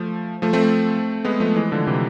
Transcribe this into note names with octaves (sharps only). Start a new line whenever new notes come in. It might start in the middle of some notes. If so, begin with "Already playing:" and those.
Already playing: F3 A3
F3 A3
A3 C4
G#3 B3
F3 A3
E3 G#3
D3 F3
C3 E3